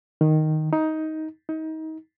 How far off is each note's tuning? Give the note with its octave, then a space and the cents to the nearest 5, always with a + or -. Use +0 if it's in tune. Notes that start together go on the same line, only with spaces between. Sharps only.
D#3 -5
D#4 +15
D#4 +30